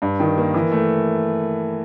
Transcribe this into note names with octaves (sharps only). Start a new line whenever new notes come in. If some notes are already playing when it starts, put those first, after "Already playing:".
G2
D#3
A#3
E3
A3